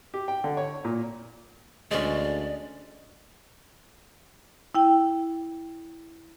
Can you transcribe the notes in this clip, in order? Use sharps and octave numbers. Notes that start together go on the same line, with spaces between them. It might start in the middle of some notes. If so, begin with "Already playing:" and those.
G4
G5
D3
C#5
A#2
D2 G#3 C#4 D5 D#5
E4 G5